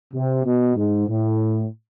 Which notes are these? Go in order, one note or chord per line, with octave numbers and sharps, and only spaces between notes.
C3
B2
G#2
A2